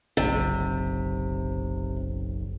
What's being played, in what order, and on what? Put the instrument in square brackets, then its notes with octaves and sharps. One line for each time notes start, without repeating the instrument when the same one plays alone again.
[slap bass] F#1 [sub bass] B1 [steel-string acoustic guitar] C3